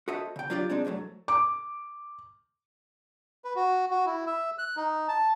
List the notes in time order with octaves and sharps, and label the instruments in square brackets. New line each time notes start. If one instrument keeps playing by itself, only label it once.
[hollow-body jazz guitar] F#4 A4 C5 D#5 E5
C#3 G5
F#3 D4 F4 G4 D5
G#3 C4 D4 D#4
C2 F2 A2 F#3 A3
[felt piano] D6
[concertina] B4
F#4
F#4
E4
E5
F#6
D#4
A5